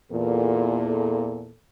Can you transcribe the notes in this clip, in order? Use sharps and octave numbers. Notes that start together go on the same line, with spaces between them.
E2 A#2 A4